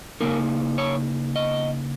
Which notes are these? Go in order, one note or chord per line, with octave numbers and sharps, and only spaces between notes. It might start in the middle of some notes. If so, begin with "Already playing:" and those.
C#3 A#3 D#4 A#4
C#5
D#5